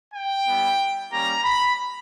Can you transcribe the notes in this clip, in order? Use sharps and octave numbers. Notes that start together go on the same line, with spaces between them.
G5
G3 B3 E4
G3 A#3 C#4 G4 A#5
B5